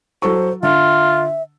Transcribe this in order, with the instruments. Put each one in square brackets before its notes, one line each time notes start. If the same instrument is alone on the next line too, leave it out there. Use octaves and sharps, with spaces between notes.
[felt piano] F#3 A4 C#6 [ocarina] C5
[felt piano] D3 [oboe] F4 [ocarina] E5